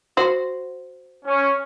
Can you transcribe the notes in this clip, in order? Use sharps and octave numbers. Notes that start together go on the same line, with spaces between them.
F#4 C5
C#4